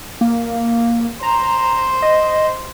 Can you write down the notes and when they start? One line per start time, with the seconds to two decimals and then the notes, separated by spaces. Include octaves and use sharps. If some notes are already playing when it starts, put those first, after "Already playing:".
0.21 A#3
1.23 C5 A#5
2.02 D#5